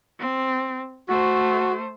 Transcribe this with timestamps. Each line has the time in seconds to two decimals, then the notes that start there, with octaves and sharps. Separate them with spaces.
0.19 C4
1.09 A3 F#4 C5